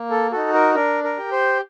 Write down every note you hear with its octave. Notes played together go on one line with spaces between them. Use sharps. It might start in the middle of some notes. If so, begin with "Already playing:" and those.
Already playing: A#3
A4
D#4 F#4 A4
A#4
D4 A#4
A#4
G4
C5